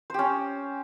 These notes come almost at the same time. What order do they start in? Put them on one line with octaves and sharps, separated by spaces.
C5 G4 C#4